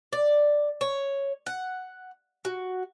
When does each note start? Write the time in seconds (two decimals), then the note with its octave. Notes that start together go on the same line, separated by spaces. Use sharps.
0.13 D5
0.81 C#5
1.46 F#5
2.45 F#4